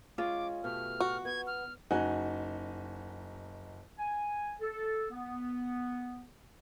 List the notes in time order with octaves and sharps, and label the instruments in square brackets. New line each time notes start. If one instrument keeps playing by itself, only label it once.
[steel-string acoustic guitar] G#3 C#4 [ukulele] F4 [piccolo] D6
[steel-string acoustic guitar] B2 A3 G4 [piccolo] F6
[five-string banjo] F#4
[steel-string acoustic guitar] B3 [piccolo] G#6
[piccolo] F6
[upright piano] F#1 D#4 F#4 G#5 F#6
[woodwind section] G#5
A4
B3